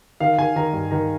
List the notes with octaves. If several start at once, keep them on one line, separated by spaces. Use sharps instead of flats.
D#3 F5
D#3 G#5
D#3 A#5
G2
D#3 A#5